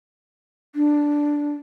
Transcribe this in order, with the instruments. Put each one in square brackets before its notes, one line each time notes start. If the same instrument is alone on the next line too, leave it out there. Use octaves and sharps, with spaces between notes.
[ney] D4